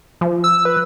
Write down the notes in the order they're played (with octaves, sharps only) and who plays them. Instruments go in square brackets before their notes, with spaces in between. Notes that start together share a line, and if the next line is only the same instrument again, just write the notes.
[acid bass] F3
[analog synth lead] E6
B4